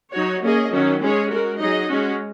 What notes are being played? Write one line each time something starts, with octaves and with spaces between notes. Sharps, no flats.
F#3 D#4 F#4 C#5
A#3 C#4 G#4 D#5
D#3 F#3 C#4
G#3 C#4 G#4 C#5
G#3 F#4 A#4
F#3 D#4 G#4 D#5
G#3 C#4 F#4